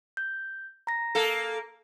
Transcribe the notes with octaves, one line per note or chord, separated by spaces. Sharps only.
G6
A#5 A#6
A#3 A4